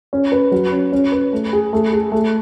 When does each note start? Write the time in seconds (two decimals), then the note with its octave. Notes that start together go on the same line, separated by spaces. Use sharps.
0.13 C#4
0.32 B4
0.52 F#3
0.72 C#4
0.93 C#4
1.12 B4
1.33 A3
1.53 G#4
1.73 A3
1.93 G#4
2.12 A3